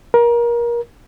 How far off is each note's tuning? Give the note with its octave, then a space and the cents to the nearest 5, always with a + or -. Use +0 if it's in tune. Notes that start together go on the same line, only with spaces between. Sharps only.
A#4 +25